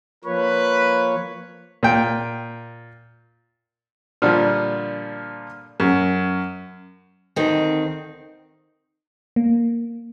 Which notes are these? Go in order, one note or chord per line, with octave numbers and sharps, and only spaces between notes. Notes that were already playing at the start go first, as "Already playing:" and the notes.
F3 A#3 B4 C#5
A#2 G5
A#2 D3 F3 G3
F#2
D2 D#3 C4
A#3